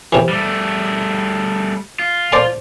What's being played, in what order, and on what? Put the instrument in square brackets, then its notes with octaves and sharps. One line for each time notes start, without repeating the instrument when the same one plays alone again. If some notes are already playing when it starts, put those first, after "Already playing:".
[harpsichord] C3 E3
[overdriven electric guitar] G3 A3
F4
[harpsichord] C5 D5 A5